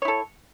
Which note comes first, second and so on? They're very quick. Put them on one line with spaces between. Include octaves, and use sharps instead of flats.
C#5 E4 A4